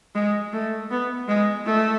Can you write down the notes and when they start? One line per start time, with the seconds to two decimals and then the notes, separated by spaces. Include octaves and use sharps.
0.15 G#3
0.53 A3
0.91 B3
1.28 G#3
1.66 A3